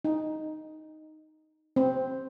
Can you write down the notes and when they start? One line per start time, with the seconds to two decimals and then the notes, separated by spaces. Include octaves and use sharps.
0.05 D#4
1.76 C4